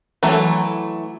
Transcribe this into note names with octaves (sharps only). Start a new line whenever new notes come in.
E3 F#3 A3